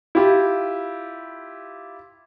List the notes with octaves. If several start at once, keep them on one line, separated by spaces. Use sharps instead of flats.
E4 F4 G4